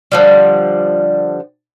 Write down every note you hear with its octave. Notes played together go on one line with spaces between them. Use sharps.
D3 F3 G3